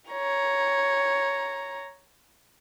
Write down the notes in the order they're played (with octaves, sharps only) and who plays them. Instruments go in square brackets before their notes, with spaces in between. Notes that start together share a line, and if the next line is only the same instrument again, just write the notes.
[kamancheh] C#5 A#5